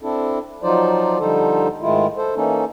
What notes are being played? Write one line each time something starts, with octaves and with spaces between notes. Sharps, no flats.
C4 D4 E4 A4
F3 F#3 D#4 F4 C5 D5
D3 F3 G3 D#4 A4 C5
G#2 D#3 G#3 A3 E4 F4
A4 C5
E3 A#3 C#4 D#4 A4